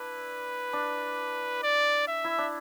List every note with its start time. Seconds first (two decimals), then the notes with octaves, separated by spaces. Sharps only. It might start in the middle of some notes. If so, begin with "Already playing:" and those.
Already playing: D4 E4 B4
0.73 D4
1.63 D5
2.08 E5
2.24 E4
2.38 D4